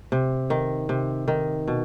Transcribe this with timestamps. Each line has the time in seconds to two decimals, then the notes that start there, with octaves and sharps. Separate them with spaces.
0.12 C3
0.50 D#3
0.89 C3
1.28 D#3
1.68 B2